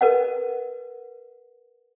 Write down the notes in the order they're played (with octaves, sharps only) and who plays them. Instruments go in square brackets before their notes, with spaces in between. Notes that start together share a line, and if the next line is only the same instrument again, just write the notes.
[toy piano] A#4 B4 D#5 F#5